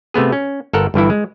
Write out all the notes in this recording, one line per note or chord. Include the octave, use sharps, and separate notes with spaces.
C3 A3 B3 G#4
C#4
G1 A4 A#4 F#5
G1 G2 E3 E4
G#3